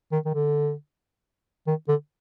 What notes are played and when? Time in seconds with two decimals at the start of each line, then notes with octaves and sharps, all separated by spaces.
0.12 D#3
0.26 D#3
0.34 D3
1.67 D#3
1.88 D3